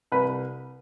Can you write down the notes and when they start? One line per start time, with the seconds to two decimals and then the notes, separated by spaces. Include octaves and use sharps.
0.12 C2 B4